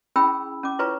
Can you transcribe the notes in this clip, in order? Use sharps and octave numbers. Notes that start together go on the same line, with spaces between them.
C#4 E4 G#4 G5 B5 E6
C#4 D6
E4 F4 B4 C#5 A#5 C#6